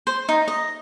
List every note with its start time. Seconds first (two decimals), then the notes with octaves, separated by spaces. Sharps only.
0.07 C5
0.29 D#4
0.48 D#5